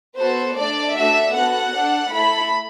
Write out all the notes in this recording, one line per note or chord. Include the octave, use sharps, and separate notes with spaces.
B3 F#4 A4 C5
A3 D4 A4 D5
A3 D4 F#4 A4 E5
B3 F#4 A4 F#5
D4 A4
A3 E4 A4 B5